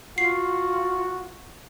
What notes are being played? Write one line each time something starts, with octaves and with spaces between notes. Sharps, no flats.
F4 F#4 C7